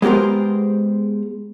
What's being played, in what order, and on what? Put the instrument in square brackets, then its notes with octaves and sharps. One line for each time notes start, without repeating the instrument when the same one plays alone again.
[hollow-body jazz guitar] G#3 B3 G4 A#4 C5